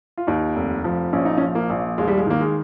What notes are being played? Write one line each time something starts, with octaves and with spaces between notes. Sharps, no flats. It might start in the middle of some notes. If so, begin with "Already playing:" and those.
F4
D#2 D#4
F1
F3
A#1 C#4
D#4
C#4
F3
A#3
A#1
D#2 G#3
G3
G#3
D#3 A#3
G#3